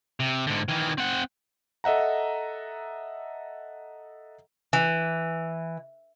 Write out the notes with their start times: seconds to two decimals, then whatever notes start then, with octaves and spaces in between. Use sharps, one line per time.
0.20 C3
0.47 G#2 D3
0.68 D#3 E3
0.98 C4 F#5
1.84 A4 D#5 E5 F#5 A#5
4.73 E3